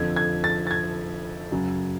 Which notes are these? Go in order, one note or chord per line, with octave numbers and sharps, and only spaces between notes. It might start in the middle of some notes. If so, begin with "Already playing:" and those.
Already playing: F2 D3 F3 G#6
G#6
A6
A6
G#6
F#2 C#3 F#3